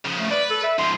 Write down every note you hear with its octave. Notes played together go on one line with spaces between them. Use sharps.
C#3 F3
A3
B4 D5
A4
E5
G#2 F3 C6